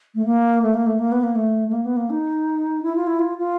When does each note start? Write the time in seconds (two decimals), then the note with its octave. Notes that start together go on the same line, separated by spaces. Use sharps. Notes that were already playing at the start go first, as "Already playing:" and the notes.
0.15 A3
0.25 A#3
0.62 A3
0.74 A#3
0.86 A3
0.99 A#3
1.12 B3
1.24 A#3
1.35 A3
1.68 A3
1.73 A#3
1.85 B3
1.97 A#3
2.10 D#4
2.83 E4
2.96 F4
3.07 E4
3.19 F4
3.38 F4